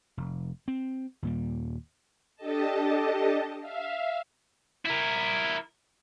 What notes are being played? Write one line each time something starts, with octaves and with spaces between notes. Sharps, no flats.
F1
C4
D#2 A#2 G3
D4 G4 A4 D#5 A5
E5 F5
E4 A#4